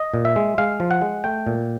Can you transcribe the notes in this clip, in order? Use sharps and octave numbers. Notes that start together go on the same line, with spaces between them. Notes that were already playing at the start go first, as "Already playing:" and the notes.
Already playing: D#5
A#2
E5
G#3
G#3 F5
F3
F#5
G#3
A3 G5
A#2